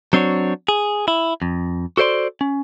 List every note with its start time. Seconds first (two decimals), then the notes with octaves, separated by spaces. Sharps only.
0.13 F#3 C4 D4 F#4 C#5
0.69 G#4
1.08 E4
1.42 F2
1.97 F#4 A4 C5 D5 C6
2.41 C#4